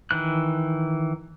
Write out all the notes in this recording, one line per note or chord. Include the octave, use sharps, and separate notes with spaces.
D#3 E3 F#6